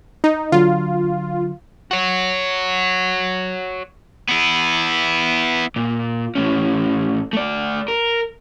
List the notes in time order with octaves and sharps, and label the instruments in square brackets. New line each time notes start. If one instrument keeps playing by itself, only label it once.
[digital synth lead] D#4
[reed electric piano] D3 F#3 [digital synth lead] F4
[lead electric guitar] F#4 C#5
[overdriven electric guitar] B3 E4
A#2
A2 C#4
A3 D5
A#4